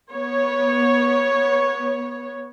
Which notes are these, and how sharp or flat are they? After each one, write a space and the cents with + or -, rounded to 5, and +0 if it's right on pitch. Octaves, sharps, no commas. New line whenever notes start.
B3 -20 C#5 +0